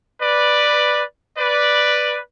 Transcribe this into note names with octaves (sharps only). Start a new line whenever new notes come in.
B4 D5
B4 D5